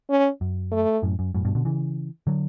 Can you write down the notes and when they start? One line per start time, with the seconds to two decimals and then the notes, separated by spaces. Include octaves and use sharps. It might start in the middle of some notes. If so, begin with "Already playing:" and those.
0.10 C#4
0.41 F#2
0.72 A3
1.03 F#2 A2
1.19 F#2
1.34 F#2 A2
1.45 G2 B2
1.55 B2 D3
1.65 C#3 E3
2.27 D3 F#3